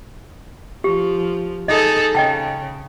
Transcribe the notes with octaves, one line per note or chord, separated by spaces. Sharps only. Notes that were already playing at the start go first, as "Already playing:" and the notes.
F3 G4
D#4 G#4 A4 D#5
C#3 D#5 G5 A5